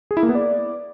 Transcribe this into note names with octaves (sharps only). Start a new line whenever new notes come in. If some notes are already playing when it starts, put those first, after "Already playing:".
G#4
E4
A#3
B3
D5